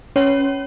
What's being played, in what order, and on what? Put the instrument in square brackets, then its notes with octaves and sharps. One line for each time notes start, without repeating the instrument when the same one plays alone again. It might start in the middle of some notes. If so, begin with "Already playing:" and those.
[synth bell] C#4 C#5